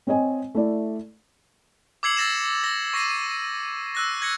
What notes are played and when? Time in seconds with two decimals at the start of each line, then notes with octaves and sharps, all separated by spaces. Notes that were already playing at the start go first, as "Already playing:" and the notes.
0.07 C4 C#5 D#5 G#5
0.55 A3 E4 D5
2.03 D6 E6 G#6 C7 C#7 F#7
2.17 E6 A6 A#6 E7
2.64 A#6
2.93 C#6 A#6 C7 D#7
3.95 E6 F#6 A#6
4.22 G#6 A#6 C#7